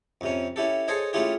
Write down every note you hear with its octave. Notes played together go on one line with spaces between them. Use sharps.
F2 C3 C#4
C#4 E4 G4 A4
G#4 A4 C5 C#5 D#5 G#5
A3 C#4 E4 F4 G4 G#4